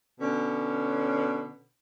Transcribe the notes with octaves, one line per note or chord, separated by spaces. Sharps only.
B2 D3 C#4